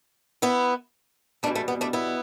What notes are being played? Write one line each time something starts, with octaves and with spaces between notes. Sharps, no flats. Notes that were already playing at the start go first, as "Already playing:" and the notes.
B3 E4
E2 B2 G3 A3 D4
A3
B3
A3 D4
B3 E4